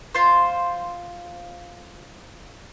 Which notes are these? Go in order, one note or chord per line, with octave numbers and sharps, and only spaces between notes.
F4 C5